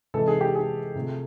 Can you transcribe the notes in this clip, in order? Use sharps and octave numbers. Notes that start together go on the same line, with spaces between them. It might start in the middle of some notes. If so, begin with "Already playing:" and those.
C3 E3 G#3 A4
G#4
G4
G#4
C3 F3 A3